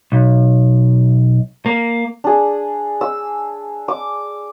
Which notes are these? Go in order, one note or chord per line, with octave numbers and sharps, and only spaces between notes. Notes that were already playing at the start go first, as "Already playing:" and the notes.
B1
A#3
D4 G#4
E6
D6